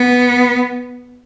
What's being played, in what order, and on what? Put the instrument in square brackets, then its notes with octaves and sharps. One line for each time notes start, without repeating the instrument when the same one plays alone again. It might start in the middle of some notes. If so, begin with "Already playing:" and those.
Already playing: [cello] B3